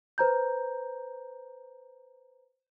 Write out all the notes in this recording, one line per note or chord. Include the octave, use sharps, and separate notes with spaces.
B4 C5 A#5 G6